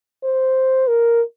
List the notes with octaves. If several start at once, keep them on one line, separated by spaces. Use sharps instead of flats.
C5
A#4